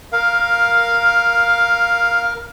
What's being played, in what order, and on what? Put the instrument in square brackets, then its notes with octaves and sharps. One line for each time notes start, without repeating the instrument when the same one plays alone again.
[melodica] A#4 [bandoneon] F5